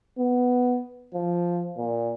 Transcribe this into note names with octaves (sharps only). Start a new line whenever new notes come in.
B3
F3
A#2